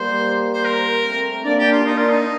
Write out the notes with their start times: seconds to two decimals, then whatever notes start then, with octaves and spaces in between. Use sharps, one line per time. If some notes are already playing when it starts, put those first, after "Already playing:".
Already playing: G3 A#3 C5
0.53 C5
0.65 A#4
1.05 A3 C4
1.45 A#3 D4 D5
1.59 G4
1.72 F4
1.85 A#3 D4 D#4
1.97 F4
2.09 D#4